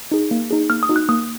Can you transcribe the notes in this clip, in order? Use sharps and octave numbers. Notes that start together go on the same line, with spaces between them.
D#4 G#4
A#3
D#4 G#4
A#3 F6
D#6
D#4 F#4
F#6
A#3 D#6